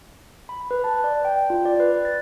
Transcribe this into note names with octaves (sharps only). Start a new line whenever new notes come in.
B5
B4
A5
D5
G5
F4
D5
B4
A6